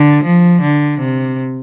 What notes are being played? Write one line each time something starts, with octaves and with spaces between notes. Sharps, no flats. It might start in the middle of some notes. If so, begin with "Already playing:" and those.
Already playing: D3
F3
D3
C3